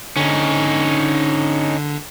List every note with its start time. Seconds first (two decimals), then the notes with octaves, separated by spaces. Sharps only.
0.17 D3 C#4 D#4